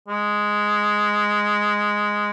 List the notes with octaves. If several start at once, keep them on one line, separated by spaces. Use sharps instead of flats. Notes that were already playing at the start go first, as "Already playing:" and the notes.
G#3